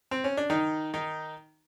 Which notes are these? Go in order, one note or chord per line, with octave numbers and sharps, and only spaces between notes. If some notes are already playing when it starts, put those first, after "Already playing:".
C4
C#4
D4
D#3 D#4
D#3 D#4